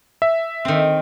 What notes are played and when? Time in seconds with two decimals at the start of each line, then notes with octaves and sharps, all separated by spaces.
0.22 E5
0.65 D#3 C4